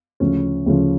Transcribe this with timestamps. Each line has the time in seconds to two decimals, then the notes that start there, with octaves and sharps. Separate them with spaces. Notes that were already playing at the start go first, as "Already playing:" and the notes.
0.20 D2 C#3 F3 C#4
0.66 D2 C#3 F3 C#4